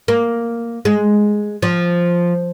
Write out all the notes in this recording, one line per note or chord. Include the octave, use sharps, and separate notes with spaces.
A#3
G#3
F3